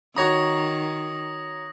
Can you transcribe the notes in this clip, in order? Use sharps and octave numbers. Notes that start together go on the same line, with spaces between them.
D#3 F#4 C#5 A#5 D#6 A#6